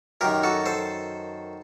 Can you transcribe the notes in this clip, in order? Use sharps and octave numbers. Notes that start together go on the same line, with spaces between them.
F#2 D#3 G4 A#4
F#4 A4
A4 C5